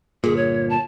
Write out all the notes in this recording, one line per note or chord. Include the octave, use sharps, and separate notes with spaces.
G1 A#2 G#4
C#5
A5